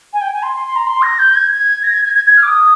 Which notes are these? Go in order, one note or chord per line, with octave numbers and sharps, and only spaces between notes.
G#5
G5
G#5
C6
C6
C6
A#5
C6
A#6
G6
G#6
G#6
A#6
G#6
G#6
G#6
G#6
F6
D6
D#6